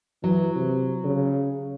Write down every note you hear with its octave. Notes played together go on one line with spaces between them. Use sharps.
E3 F#3
C3
C#3